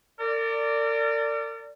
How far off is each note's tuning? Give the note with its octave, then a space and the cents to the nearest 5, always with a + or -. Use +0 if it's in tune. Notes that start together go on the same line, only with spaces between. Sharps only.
A#4 -40 D5 -5